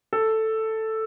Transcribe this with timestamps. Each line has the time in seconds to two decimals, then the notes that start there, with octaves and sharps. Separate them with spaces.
0.13 A4